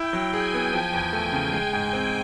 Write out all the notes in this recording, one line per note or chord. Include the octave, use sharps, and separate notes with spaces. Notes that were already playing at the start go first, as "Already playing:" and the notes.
Already playing: E4 G5
F#3
G#4 G#5
B3
F3 G#5
E2
A3
C#3
G#3
G#2
C4